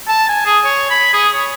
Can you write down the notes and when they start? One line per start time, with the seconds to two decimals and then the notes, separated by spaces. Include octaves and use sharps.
0.08 A5
0.28 G#5
0.46 G#4
0.65 C#5
0.90 B5
1.13 G#4
1.33 C#5